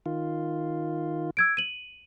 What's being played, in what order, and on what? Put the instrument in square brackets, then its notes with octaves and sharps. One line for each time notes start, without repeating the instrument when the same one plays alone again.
[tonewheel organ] D#3 F4
[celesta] E6 G#6 D7
D#7 F#7